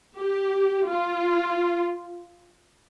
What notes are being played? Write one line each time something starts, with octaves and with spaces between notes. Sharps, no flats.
G4
F4